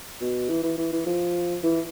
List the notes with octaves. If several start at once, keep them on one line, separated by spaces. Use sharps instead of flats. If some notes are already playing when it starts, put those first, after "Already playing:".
B2
E3
E3
E3
E3
F3
E3